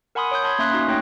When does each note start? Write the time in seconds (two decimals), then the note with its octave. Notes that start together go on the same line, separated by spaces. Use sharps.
0.15 A#4 F#5 G#5 B5 C6 D#6
0.31 C#5 D#6 G6
0.44 A5 B5 C6 D#6 G#6
0.59 A#3 C#4 E5 C6 D#6 F#6
0.71 C#4 D#4 F#4
0.88 A3 D#4 C#5 G5 F#6 A#6